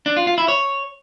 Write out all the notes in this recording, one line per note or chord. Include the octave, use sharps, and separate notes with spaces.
D4
F4
F4
E4
C#5